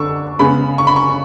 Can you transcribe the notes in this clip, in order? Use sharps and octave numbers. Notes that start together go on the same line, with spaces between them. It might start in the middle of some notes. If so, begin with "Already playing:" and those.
Already playing: D3 D4 C#6 E6
C#3 G#3 B3 B5
C#6
B5
C#6